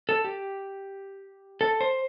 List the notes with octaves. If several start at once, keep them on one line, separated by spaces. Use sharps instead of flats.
A4
G4
A4
C5